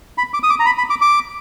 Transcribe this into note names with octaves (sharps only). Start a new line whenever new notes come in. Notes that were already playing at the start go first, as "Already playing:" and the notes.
B5
D6
D#6
D6
A#5
B5
B5
D6
D6